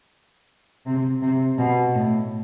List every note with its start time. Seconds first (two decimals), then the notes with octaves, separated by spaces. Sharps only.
0.86 C3
1.22 C3
1.58 B2
1.95 A2